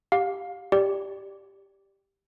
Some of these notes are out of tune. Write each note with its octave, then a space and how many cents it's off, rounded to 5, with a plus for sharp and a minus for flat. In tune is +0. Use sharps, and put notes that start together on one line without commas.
G4 +0 F5 +30
G4 +0 D5 +0